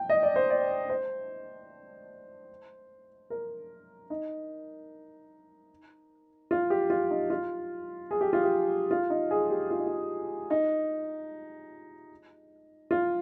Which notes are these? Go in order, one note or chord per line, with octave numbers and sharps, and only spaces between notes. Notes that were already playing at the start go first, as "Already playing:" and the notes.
Already playing: G5
D#5
D5
C5
D5
C5
A#4
D#4
F4
G4
F4
D#4
F4
G#4
G4
F4
G4
F4
D#4
G#4
G4
F4
D#4
F4
D#4
F4